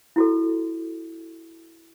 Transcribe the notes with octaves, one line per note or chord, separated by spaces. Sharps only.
E4 F#4 A4